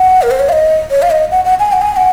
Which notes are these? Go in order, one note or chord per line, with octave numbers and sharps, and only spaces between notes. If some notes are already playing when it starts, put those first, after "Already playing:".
Already playing: F#5
A#4
C5
C#5
F5
D#5
C#5
F5
D#5
F#5
F#5
G#5
F#5
G#5
G#5
F#5